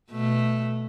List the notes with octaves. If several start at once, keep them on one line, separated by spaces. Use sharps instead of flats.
B2 A3